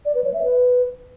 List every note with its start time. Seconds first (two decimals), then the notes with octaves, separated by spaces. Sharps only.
0.05 D5
0.15 B4
0.24 C#5
0.34 E5
0.43 B4